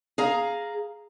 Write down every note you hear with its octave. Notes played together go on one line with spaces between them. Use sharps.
G#4 F5 A#5